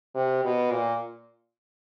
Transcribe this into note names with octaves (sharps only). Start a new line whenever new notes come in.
C3
B2
A#2